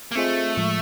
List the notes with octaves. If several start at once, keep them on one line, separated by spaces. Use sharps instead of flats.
A#3
A3 C4 F4 G#4 C5 D#5
A2 F3 G#3